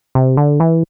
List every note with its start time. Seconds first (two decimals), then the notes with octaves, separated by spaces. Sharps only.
0.15 C3
0.37 D3
0.60 E3